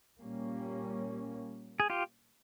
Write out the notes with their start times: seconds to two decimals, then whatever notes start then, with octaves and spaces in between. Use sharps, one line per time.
0.20 A#2 G3 A#3 C#4
1.80 G#4
1.90 F4 G4